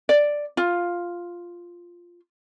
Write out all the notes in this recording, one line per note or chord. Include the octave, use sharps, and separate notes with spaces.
D5
F4